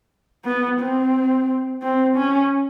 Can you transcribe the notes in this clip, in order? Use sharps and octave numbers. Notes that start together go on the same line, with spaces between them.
B3
C4
C4
C#4